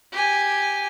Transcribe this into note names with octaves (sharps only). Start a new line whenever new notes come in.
G4 G#5